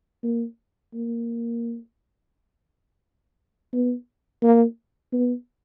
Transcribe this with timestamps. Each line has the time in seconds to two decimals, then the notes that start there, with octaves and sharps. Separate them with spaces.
0.24 A#3
0.94 A#3
3.73 B3
4.43 A#3
5.13 B3